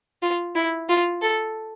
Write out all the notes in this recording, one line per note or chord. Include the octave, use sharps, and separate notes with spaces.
F4
E4
F4
A4